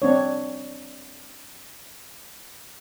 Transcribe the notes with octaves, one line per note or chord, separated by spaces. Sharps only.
C4 D4 C#5